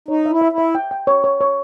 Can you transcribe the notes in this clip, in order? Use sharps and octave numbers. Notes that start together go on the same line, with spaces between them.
D#4 C#5
E5
E4
E5
E4
E5
G5
G5
C#5
C#5
C#5